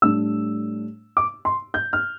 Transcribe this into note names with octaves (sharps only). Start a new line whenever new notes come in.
A2 G3 D4 E6
D6
C6
G6
F6